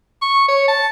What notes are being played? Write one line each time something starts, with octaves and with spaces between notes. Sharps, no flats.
C#6
C#5
A5